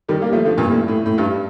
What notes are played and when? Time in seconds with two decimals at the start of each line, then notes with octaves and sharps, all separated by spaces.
0.09 D#3 G3
0.22 G3 A#3
0.33 F3 A3
0.45 D3 F3
0.58 G2 A#2
0.70 A2
0.88 A2
1.06 A2
1.18 G2